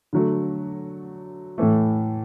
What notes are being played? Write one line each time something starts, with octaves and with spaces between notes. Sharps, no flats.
D3 F#3 A3
A2 E3 A3